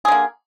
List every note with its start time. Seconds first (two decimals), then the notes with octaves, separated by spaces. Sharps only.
0.05 G#4
0.08 D3
0.12 A#3